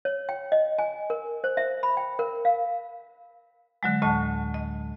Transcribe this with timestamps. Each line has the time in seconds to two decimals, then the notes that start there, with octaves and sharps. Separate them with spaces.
0.05 C#5
0.29 G5
0.52 D#5
0.79 G#5
1.10 A#4
1.44 C5
1.57 E5
1.83 B5
1.97 G5
2.19 A#4
2.45 F5
3.83 D3 F#3 G#3
4.02 D2 A2 D#5 A5
4.54 D#5